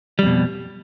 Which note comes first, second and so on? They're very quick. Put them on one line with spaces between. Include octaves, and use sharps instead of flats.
G3 F2 B2